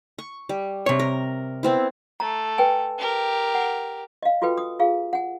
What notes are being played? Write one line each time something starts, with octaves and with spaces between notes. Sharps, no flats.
C#6
G3
C3 C#5
A#4
B3 C4 E4
A3 A#5
B4 G5 G#5
G4 A#4
F#5
D#5 F5
F4 F#4 A4 B4 G5
D#6
F4 G#4 F5
F#5 G#5